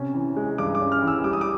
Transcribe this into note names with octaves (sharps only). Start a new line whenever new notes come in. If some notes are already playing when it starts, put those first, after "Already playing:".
Already playing: C3 C#4
E3
G#3
G2 D6
D6
C#4
F6
E3
E6
G3 D6
D#6
D6